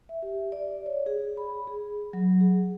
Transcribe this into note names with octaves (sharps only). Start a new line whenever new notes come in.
E5
G4
D5
C#5
G#4
B5
G#4
F#3
G#4